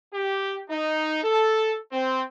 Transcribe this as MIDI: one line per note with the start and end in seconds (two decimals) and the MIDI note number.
0.14 0.60 67
0.70 1.20 63
1.24 1.77 69
1.92 2.23 60